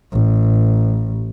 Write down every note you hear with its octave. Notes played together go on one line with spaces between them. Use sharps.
A1